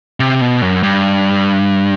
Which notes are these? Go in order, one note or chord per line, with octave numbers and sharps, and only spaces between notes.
C3
B2
F#2
G2